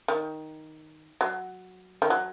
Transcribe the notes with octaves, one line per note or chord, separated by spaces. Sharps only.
D#3
F#3
D#3
F#3